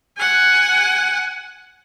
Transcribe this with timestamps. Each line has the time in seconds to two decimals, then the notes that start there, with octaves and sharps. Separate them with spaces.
0.17 F#5 G#5